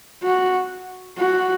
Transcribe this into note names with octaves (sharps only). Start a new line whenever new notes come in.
F#4
F#4